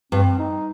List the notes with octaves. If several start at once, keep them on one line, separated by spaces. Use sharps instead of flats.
G2 C4
D#4